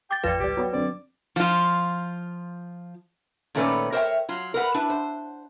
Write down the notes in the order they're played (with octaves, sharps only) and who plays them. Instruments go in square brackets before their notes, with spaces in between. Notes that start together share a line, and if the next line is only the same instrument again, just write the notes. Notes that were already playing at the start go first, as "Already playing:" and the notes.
[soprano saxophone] G5 [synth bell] D6 A6
[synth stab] A1 F2 F4 [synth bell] B4 D5
[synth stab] G#1 C#2 G3 [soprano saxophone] G4
[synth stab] F#3 B3 F#4
[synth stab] F#2 D3 C4 [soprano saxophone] D5
[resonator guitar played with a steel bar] F3 F4
A#2 D#3 A3 C#4 B4 D5
A#4 C5 C#5 D#5 E5 G5
F#3 F4
A#4 B4 F#5
D4 E4 B4
C5